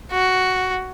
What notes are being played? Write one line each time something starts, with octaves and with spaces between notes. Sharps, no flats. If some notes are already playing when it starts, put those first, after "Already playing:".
F#4